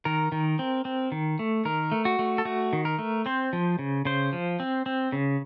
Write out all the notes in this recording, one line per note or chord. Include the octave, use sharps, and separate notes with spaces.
D#3 A#4
D#3
C4
C4
D#3
A3
D#3 A#4
A3
F#4
A3
A4
A3 F#4
D#3
A#4
A3
C4 C5
F3
C#3
C#3 C5
F3
C4
C4
C#3